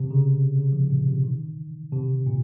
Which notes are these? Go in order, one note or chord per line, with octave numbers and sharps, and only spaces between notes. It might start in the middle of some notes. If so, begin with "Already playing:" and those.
Already playing: C3
C#3
C3
C#3
F3
A#2
C3
D#3
C3
A#2